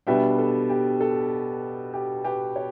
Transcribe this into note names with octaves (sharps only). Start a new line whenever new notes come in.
B2 G3 B3 D4 E5 G5
A4
G4
A4
G4
G4 B4
C#5